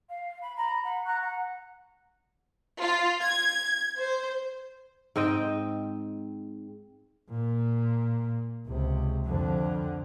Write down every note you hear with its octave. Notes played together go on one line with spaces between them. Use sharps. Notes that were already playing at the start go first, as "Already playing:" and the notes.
F5
B5
A#5 B5
F#5 B5
A#5 C#6 F#6
F#5
F4
G#6
C5
G#2 C4 D#5 G5
A#2
C#2 C3
F2 D3